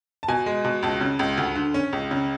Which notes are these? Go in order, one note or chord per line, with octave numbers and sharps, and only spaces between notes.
A5
B2 G#5
G#3
B2
C#2 A5
C#3
C#2
D2
D3
C#4
C#2
C#3